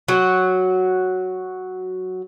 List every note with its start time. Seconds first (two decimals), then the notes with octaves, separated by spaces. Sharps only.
0.08 F#3 F#4